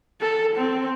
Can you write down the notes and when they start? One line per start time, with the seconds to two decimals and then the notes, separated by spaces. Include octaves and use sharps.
0.21 A4
0.56 C4